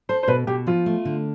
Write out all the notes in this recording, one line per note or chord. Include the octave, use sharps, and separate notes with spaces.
A4 C5
C5
B2 B4
B2 G4
F3 F4
A3
D3